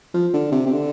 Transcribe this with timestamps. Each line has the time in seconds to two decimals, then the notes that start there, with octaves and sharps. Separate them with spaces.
0.14 F3
0.33 D3
0.51 C3
0.66 C3
0.72 D3